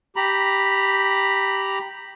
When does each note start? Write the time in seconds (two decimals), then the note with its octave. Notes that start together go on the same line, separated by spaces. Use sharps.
0.16 G4 A#5 B5